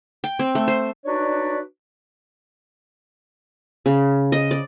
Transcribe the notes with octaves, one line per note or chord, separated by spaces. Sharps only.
G5
C4
A3
C5
D4 D#4 F#4 B4 C#5 D5
C#3
D#5
D5